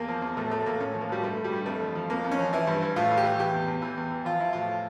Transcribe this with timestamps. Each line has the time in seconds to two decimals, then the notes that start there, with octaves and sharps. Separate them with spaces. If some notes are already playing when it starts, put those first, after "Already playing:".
Already playing: E2 A#3
0.08 F3
0.22 E2
0.37 A2 A3
0.51 A2 A3
0.66 A2 A#3
0.80 A2 C#4
0.94 F3
1.01 A#3
1.09 A2 G3
1.23 G2 A3
1.37 G2
1.44 G3
1.52 G2
1.66 F2 A3
1.81 F3
1.95 F3
2.10 F2 A#3
2.24 F2
2.31 C#4
2.39 F3
2.53 E3 E4
2.67 G2
2.82 E3
2.96 A2 F4
3.11 E3
3.18 G4
3.24 E3
3.39 E3 G4
3.54 E2
3.68 E2
3.82 E3
3.97 E2
4.11 E3
4.25 F3 F4
4.40 F3 E4
4.53 A2 F4